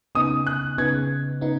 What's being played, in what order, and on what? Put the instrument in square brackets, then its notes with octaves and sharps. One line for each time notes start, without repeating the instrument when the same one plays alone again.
[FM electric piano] C#3 B3 D#4 [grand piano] D#6
[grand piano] F#6
[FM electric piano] C#3 B3 D#4 [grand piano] G#6
[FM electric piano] C#3 B3 D#4